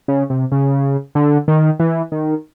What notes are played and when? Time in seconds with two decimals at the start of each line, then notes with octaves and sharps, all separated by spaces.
0.08 C#3
0.30 C3
0.52 C#3
1.15 D3
1.48 D#3
1.80 E3
2.12 D#3